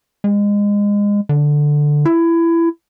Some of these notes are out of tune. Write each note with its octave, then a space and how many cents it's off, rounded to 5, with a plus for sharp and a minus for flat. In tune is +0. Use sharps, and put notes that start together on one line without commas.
G#3 -25
D3 +5
E4 +20